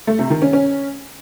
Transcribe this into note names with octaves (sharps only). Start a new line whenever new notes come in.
A3
C3
D#3
C#4
C#4